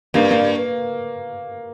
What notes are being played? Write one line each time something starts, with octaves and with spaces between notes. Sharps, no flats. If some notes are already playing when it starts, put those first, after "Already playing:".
G2 A#3
A#3